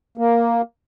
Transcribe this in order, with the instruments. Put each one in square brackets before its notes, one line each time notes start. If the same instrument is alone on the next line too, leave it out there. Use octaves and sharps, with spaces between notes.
[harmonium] A#3